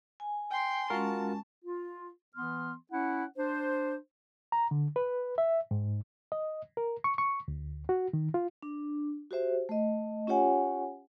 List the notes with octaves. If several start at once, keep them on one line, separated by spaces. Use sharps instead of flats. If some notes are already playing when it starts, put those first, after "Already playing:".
G#5
G5 C6
G#3 C#4 F4 F#4 A#4 A5
F4
E3 B3 C6 F6
C#4 E4 F#5
D4 C5
A#5
D3
B4
E5
G#2
D#5
A#4
C#6
C#6
D2
F#4
D#3
F4
D4
F#4 G4 C5 E5
A3 D#5
C#4 F4 G4 C#5 F#5 G#5